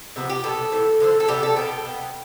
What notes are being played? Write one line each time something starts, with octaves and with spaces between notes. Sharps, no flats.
C3 F3 B3
G4
B2 B3 A4
A2 E3 B3
D3 F3 A3
A4
C3 G3 B3 G4
A4
B2 G3 B3 G5
B2 B3